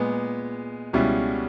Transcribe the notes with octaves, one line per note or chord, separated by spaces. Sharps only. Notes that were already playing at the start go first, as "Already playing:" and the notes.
Already playing: A#2 G#3 B3
C#2 B2 G3 C#4 E4